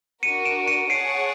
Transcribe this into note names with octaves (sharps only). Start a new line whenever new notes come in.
D4 F#4 A#4 C#7 D#7
D7 E7
C#7 D#7
G#4 C#5 F#5 A5 C7 D7